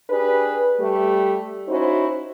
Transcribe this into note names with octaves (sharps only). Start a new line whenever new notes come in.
D4 G4 G#4 B4
G3 A3 G4
C#4 D#4 E4 F#4 C5